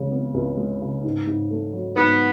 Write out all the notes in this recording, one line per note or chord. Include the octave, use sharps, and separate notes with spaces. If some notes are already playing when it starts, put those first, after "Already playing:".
Already playing: C#2 C#3 G#3
B3
C#2
G#3
C#3
G#2
G#2
A3
F#3
G#2 B3